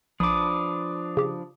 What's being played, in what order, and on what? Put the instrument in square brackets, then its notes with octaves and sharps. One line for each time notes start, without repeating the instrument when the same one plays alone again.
[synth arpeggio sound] A#1 [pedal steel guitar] F3 D4 B4 [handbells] D6 D#6
[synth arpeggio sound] C#3 G4